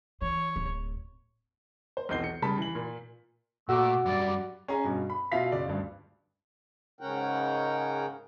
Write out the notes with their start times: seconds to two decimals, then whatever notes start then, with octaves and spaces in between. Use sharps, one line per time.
0.22 E3 C#5
0.56 D1
1.97 C5
2.09 B1 E2 C4 G6 C7 G7
2.24 C#7
2.42 C#3 G3 A5 B5 B6
2.58 E3 F#7
2.75 A#2
3.69 A#2 A3 F#4 D6 E6
4.06 F#2 G3 D5
4.68 C#4 G#4 G#5 A#5
4.84 G2 B2
5.10 B5
5.32 B2 F4 E5 F5 B6
5.52 F#1 D5
5.68 D2 G2
7.01 G#2 C#3 C#4 A#4 F#5 G5